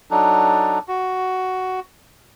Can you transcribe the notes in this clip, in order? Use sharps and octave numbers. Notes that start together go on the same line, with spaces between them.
F#3 D4 D#4 A4
F#4